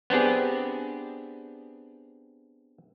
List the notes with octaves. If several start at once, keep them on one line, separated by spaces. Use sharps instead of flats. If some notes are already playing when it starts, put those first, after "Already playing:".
B3 C4 D4 G4 G#4